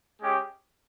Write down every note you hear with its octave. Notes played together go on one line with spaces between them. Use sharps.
G#3 C#4 G4